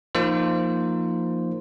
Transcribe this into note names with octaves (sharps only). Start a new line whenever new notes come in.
F3 A#3 D#4 C5